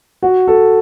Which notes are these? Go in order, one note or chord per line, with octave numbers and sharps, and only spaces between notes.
F#4
A4